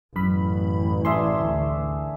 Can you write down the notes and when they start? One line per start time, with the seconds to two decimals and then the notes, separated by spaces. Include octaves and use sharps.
0.16 A1 F#2 B5
1.05 D4 G#4 E5 C6
1.40 D2